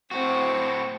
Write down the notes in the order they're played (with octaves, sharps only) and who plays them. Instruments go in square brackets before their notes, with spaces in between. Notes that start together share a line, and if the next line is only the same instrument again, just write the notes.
[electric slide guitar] A2 F#4 [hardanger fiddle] C4 C#6